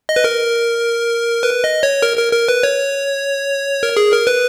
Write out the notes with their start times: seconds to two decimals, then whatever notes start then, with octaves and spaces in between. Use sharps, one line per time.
0.09 D#5
0.16 B4
0.24 A#4
1.43 B4
1.64 D#5
1.83 C#5
2.02 A#4
2.17 A#4
2.32 A#4
2.48 B4
2.63 C#5
3.83 A#4
3.97 G#4
4.12 A#4
4.27 B4